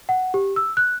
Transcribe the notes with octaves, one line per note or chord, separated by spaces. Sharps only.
F#5
G4
E6
F#6